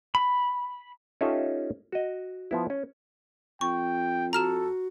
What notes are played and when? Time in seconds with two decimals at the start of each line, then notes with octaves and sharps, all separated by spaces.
0.15 B5
1.21 C#4 D#4 F4 G4 A4 E5
1.92 F#4 D#5
2.51 F3 B3 E4
2.70 C#4
3.61 F2 G5 C#6
4.33 F#4 A4 A#5 F6 E7